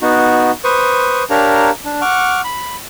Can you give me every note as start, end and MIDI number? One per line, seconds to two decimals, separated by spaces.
0.02 0.51 59
0.02 0.51 63
0.02 0.51 66
0.64 1.23 71
0.64 1.23 72
0.64 1.23 85
0.64 1.23 87
1.30 1.70 62
1.30 1.70 67
1.30 1.70 70
1.30 1.70 73
1.30 1.70 77
1.30 1.70 82
1.85 2.01 62
2.01 2.41 78
2.01 2.41 85
2.01 2.41 86
2.01 2.41 89
2.44 2.76 83